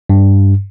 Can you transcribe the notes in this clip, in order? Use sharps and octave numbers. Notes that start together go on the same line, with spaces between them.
G2